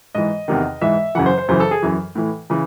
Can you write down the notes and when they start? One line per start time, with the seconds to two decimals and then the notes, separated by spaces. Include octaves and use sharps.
0.15 G#2 E3 D#5
0.48 E2 C3 D#3
0.82 G#2 E3 E5
1.15 F#2 C#3 E3 F#5
1.26 C5
1.38 C5
1.48 F#2 C#3 E3 C5
1.60 A4
1.71 G#4
1.82 F#2 E3
2.15 A2 E3
2.50 C#3 E3